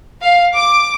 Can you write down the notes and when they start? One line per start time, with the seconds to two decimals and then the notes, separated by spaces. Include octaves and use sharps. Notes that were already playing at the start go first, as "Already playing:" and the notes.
0.22 F5
0.54 D6